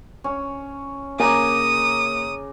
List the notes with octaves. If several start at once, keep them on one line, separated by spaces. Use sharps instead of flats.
C#4
C#3 A#3 G#5 A#5 D6 D#6